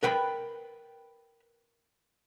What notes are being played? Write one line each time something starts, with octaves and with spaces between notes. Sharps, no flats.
A#4 B4 G5 B5